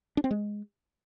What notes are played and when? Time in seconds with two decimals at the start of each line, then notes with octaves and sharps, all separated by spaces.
0.17 D4
0.24 C4
0.31 G#3